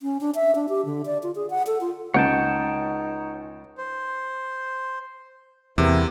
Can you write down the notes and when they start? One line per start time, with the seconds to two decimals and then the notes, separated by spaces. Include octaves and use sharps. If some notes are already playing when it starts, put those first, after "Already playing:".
0.02 C#4
0.21 D4
0.35 E5
0.55 D4
0.69 G4
0.85 D3
1.06 D5
1.23 F4
1.35 G#4
1.50 F#5
1.67 A4
1.81 F4
2.14 C#2 C#4 D#4 C#5 F#5 G5 A5
3.78 C5
5.78 E2 C3 A#3 B3 E4